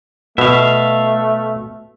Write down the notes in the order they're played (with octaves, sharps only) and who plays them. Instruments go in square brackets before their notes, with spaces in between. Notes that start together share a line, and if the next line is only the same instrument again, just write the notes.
[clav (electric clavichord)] B2 [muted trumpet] A3 [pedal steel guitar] E5 F5